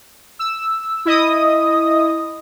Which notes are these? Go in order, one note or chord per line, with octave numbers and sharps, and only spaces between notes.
E6
E4 D#5 D#6